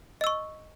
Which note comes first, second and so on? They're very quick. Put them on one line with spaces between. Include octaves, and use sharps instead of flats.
D#5 E6 C#6